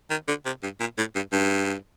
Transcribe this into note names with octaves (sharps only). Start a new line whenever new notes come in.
D#3
D3
C3
G2
A#2
A2
G2
G2